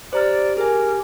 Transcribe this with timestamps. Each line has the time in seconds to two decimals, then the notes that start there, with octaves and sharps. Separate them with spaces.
0.13 G4 C5 D5 A#5 F6
0.57 G#4 A#4 G#5